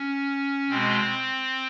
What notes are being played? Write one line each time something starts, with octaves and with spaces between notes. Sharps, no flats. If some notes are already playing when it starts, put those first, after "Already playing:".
Already playing: C#4
B2 G#3 C4